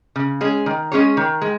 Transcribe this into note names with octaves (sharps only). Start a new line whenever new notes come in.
C#3
G#3 C#4 G#4
D#3
G#3 C#4 G#4 C#5
D#3
G#3